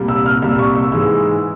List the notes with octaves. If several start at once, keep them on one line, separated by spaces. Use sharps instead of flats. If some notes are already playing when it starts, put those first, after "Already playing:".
Already playing: C2 A#2 G3
E6
F6
C2 A#2 G3 E6
C#6
E6
G#2 E3 G#3 E6